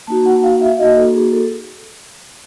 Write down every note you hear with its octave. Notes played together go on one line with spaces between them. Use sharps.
A#3 D#4 F#4 A5
F#5
F5
F5
E5
A#3 D#4 F#4 D#5
A4
G#4
A4